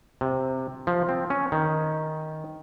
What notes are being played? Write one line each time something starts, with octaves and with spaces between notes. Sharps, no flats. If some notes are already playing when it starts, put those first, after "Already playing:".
C3
F3
C4
C#4
D#3